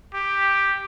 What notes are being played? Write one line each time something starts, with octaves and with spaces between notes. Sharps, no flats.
G4